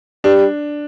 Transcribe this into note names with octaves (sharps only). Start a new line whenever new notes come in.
G3 D4